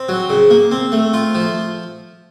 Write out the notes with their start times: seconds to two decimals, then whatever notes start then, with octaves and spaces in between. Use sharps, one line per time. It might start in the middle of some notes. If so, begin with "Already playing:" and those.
Already playing: C4
0.09 F#3
0.30 C#3
0.50 A#3
0.71 C4
0.92 A3
1.13 F4
1.35 F3